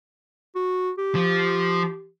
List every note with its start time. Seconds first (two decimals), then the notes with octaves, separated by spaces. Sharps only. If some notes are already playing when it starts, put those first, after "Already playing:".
0.55 F#4
0.98 G4
1.15 F3